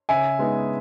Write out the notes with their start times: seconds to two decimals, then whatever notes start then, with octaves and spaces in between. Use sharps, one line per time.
0.09 C#3 E5 G#5
0.39 G#3 B3 D#4